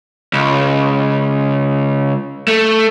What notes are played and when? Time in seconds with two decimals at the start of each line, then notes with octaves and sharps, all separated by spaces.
0.33 C#2
2.48 A3